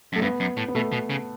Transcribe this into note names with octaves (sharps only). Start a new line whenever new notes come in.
F#2 A3
G2 B3
F#2
A2
B3
B2 A3
B2
C#3